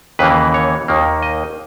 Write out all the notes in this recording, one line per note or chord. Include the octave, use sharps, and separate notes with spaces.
D#2 C#3 E3 A#3 B4
C#5
D#2 D#3 A#3
D#5